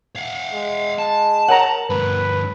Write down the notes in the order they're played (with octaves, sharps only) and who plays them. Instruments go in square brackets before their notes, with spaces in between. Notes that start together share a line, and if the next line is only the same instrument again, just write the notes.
[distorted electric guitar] F5 F#5
[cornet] G#3
[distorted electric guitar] A5
[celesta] A#4 C#5 F#7 [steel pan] F#5 A#5
[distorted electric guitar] D2 G2 [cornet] B4